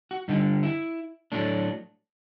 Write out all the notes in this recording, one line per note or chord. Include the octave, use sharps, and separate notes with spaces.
F#4
G2 D3 G3 D#4
E4
A2 F#3 A3 D4